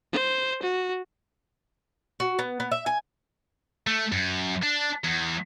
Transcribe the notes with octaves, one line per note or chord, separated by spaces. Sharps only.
C5
F#4
F#4
B3
B3
E5
G#5
A3
F#2
D4
E2